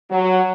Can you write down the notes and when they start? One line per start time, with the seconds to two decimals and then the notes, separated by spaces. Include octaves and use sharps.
0.11 F#3